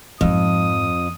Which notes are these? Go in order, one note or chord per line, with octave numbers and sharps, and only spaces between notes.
F2 G#2 F3 D#6